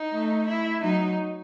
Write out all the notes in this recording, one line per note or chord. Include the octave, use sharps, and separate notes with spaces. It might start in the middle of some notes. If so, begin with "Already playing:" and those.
Already playing: D#4
A3
E4
F#3 D#4